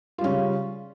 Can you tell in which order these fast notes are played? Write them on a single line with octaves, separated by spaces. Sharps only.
F4 G3 C#4 C#3